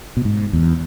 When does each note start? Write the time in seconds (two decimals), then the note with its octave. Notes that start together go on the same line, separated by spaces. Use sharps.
0.17 B2
0.25 G#2
0.53 E2